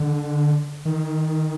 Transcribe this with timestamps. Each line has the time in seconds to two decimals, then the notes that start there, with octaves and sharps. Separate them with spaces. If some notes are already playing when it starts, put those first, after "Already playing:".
Already playing: D3
0.85 D#3